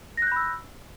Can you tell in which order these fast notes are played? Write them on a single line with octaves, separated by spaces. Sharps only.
A#6 F#6 G6 B5 E6